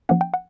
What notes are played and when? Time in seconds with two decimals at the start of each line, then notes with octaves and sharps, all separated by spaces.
0.09 F3 A#3 C#4 F#5
0.21 G5
0.34 F#5